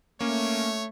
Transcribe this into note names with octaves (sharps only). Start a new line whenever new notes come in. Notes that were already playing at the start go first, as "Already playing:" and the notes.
A3 A#3 C#4 C#5